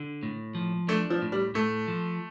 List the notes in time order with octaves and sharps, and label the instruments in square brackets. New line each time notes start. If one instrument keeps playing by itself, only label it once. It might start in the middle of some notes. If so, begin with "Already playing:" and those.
Already playing: [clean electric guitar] D3
A2
F3
[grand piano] A3 [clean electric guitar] D4
[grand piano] F3
[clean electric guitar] A2
[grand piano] G3
[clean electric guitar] A2 [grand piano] A3
[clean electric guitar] F3